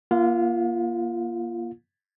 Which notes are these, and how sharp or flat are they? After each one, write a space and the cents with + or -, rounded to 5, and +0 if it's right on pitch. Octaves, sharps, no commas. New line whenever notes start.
A#3 +25 F4 -25 F5 +40